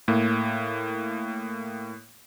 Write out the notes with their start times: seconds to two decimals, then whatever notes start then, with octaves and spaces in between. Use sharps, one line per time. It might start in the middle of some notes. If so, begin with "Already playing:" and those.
0.08 A2 A#3